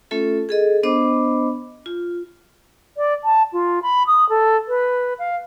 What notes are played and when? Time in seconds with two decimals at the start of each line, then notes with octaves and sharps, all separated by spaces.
0.11 A3 C#4 F4 A4 E5
0.49 G#4 A4 D#5
0.83 B3 D4 C5 D#5 B5 D6
1.86 F4
2.97 D5
3.24 A5
3.52 F4
3.82 B5
4.07 D#6
4.29 A4
4.68 B4
5.19 F5